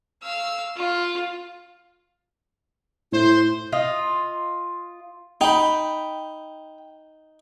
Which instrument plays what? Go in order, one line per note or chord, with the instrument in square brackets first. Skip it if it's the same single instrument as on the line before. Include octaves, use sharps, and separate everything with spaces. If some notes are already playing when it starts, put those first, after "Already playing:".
[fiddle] F5 E6
F4
[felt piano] A2 [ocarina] E4 [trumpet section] C5
[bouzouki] F4 D#5
[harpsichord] D#4 [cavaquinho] G5 B5